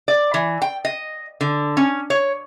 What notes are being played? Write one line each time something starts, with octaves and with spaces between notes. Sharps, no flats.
D5
E3
G5
D#5
D3
C#4
C#5